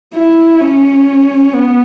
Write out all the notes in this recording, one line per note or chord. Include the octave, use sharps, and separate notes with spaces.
E4
C#4
B3